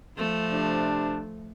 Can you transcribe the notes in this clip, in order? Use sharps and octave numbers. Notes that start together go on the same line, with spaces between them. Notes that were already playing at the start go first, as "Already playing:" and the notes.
F3 A3
C3 D4